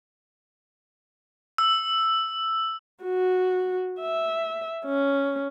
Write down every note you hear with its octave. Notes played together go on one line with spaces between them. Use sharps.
E6
F#4
E5
C#4